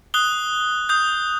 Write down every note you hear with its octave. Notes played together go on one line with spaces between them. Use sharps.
D#6 F#6 G7
D#6 G6